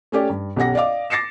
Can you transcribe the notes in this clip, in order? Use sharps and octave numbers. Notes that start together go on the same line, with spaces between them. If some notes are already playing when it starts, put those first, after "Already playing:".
A3 C#4 G4 D5
G2
B1 C#4 G4 F#5 A#6
D5 D#5 F5 D6
D6 A6 A#6 C7 C#7 E7